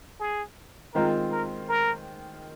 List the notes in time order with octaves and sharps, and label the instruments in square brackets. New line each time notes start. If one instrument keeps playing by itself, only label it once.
[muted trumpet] G#4
[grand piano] D#3 G#3 C4 F4 [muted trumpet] A#4
[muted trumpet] A#4
A#4